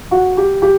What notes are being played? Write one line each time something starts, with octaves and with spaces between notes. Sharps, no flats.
F#4
G4
G4